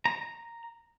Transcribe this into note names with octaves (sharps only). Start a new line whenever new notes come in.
A#5